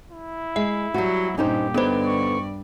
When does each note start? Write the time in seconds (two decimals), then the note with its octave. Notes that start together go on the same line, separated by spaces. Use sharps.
0.12 E4
0.56 G#3 E5
0.94 F#3 G3 F#4
1.38 G2 A#2 C#4 D#4 G4 C5
1.74 G2 D3 B3 D#4 B4 C5 D5
2.07 C#6